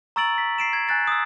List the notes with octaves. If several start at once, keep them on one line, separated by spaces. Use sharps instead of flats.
A#5 C#6 E6 A6 D7 F#7
B6
C7 D7 E7
G#6
G#5 F#6 A6 D7
D#6 E6